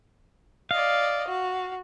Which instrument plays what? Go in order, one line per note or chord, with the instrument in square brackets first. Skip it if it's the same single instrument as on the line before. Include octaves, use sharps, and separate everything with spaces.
[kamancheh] D5 D#5 [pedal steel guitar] F5
[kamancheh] F#4